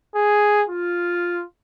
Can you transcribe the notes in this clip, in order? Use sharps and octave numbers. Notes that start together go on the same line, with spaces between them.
G#4
F4